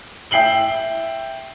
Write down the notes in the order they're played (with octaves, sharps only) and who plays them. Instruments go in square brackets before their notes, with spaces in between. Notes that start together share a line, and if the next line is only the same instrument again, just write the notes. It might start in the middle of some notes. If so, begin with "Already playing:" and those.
[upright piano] E5 G5 C7 F#7 G7